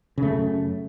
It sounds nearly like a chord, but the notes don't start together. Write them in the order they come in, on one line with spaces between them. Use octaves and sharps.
C#3 A3 F#2